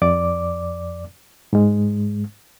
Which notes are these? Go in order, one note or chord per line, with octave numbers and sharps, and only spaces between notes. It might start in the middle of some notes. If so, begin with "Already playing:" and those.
F2 D5 D6
G#2 G#3